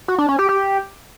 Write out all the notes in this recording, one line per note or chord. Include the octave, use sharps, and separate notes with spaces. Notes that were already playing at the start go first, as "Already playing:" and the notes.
F#4
D4
C#4
G4
G4